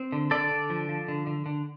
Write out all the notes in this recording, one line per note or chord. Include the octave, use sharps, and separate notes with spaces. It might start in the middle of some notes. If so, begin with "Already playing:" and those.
Already playing: C4
D3
D3 A4 D5
D3
F3
F3
D3
D3
D3